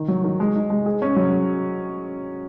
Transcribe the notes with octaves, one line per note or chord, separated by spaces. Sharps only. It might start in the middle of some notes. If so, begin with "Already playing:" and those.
Already playing: D#3
F#3
D#3
G#3
D#4
G#3
G#4
C#4
F#3